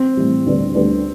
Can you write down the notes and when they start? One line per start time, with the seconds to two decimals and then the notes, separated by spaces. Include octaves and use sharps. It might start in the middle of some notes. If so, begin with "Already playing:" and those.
Already playing: C4
0.17 A2 E3 G3
0.46 D2 D3 G3 B3 D4
0.75 D2 D3 G3 B3 D4